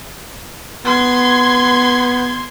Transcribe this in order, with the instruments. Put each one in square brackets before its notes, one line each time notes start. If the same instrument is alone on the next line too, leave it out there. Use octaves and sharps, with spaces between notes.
[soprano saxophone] B3 [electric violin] C6 G#6